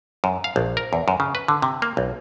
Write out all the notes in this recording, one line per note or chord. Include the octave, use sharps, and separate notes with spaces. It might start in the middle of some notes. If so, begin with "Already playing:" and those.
F#2
F5
A#1
A#4
E2
F#2
C#3
B4
D3
C3
A#3
B1